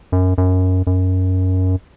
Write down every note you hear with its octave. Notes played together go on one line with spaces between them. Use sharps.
F#2
F#2
F#2